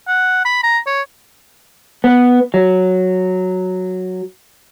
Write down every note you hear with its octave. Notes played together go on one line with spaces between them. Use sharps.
F#5
B5
A#5
C#5
B3
F#3